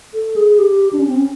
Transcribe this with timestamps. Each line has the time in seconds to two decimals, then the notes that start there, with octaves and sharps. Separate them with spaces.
0.14 A4
0.36 G#4
0.59 G4
0.93 D4
0.99 C#4
1.07 C4
1.15 C#4